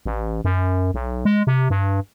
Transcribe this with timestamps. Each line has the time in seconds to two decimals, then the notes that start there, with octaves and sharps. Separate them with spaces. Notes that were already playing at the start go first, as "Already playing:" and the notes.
0.06 A1
0.45 F#2
0.94 B1
1.25 G#3
1.47 C3
1.70 G2